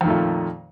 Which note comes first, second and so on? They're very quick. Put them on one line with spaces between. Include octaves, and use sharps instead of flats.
F2 D#3 A3 A#2